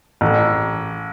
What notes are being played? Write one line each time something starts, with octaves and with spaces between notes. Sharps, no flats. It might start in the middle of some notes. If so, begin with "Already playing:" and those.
A1